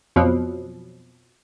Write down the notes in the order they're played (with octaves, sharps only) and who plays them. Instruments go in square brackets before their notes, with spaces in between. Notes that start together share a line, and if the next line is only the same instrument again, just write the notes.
[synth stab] F2 B2 F3 F#3